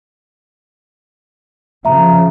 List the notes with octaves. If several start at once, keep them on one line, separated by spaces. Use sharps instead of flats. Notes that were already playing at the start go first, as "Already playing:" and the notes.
C#3 F3 E5 A#5